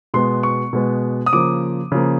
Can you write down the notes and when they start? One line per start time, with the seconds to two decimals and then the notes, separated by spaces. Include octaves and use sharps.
0.14 B2 G#3 B3 C6
0.43 C#6
0.73 B2 G#3 B3
1.26 D#6
1.33 C#3 F3 A#3 D6
1.92 C#3 F3 A#3